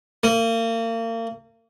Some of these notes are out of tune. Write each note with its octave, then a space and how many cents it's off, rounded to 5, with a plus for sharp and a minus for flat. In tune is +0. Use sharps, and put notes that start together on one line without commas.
A#3 -35